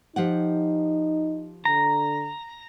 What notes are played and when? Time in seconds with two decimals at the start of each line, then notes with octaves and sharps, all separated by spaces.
0.16 F3 D#4 G4 F#5
1.65 D3 A#5